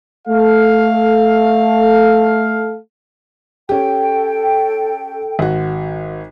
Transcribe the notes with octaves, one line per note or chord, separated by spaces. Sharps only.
A3 A4 F5
C#4 G4 A4 G5
G#1 F#4